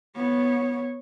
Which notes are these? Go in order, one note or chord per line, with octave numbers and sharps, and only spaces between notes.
B3 C#5